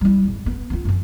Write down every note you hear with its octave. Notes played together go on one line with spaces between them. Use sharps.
G3 E4
G#1 E2
B3
B3 F4
F#2 E3